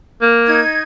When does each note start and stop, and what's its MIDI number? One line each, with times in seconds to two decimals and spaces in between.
0.22 0.61 58
0.47 0.82 63
0.47 0.82 92